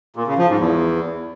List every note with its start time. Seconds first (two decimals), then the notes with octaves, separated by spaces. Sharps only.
0.16 A#2
0.27 C#3
0.38 F3
0.49 G#2
0.59 E2